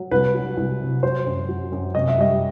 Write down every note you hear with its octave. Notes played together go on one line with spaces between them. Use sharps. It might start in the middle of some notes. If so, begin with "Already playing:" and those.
Already playing: F#3
C2 B4
F#3
C2
C3
F#3 C5
F#2
F#3
F#2
C3 D#5
E5
G3 D#5